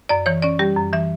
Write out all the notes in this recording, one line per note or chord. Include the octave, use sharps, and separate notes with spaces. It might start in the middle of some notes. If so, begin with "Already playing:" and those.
F#2 D5
E3 C#5
C#4 D5
G3 G4
F#2
E3 E5